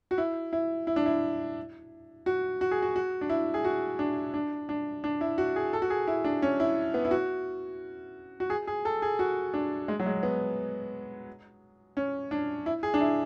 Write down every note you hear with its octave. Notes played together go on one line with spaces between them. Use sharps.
F#4
E4
E4
E4
D4
E4
F#4
F#4
G#4
F#4
F#4
D4
E4
G#4
F#4
D4
D4
D4
D4
E4
F#4
G#4
A4
F#4
G#4
E4
D4
C#4
E4
B3
E4
F#4
F#4
G#4
G#4
A4
G#4
F#4
D4
G#3
F#3
G#3
B3
C#4
D4
E4
G#4
D4
E4